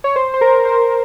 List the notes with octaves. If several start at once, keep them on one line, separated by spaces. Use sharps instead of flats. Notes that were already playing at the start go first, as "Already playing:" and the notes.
C#5
C5
C5
A#4
C5